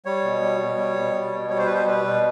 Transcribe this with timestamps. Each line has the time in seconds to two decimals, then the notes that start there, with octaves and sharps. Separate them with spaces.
0.05 G3 C#5
0.24 B2
0.42 G3
0.60 B2
0.78 G3
0.96 B2
1.14 G3
1.33 B2
1.50 G3 C#5
1.59 C5
1.66 B2 B4
1.74 C5
1.87 G3 B4
2.05 B2